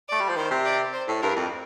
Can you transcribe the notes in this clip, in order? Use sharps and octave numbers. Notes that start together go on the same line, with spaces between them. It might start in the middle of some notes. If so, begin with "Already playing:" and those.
A3 D5
G3
F3
D#3 C5
C3
D5
C5
A2
G2 A#4
F2